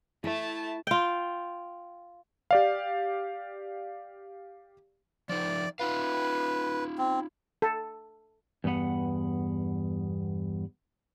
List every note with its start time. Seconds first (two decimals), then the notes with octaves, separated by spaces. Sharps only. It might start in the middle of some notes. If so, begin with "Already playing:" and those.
0.24 A3 E4 A5
0.87 F4 G5
2.51 G4 D5 F5
5.29 F3 D#4 D5
5.80 D#4 F4 B4 F5
6.98 C4
7.62 A4
8.64 E2 G2 A#2 B3 F#5